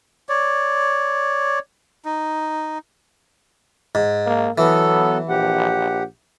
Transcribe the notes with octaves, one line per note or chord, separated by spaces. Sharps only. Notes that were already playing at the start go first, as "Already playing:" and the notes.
C#5 D5
D#4
G#2
A#3
E3 F#3 B3 A4
A#1 G4 F#5